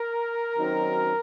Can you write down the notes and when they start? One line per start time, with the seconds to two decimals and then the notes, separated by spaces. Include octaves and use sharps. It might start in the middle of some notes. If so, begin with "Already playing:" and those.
Already playing: A#4
0.56 F#2 D#3 F#3 C4 D#4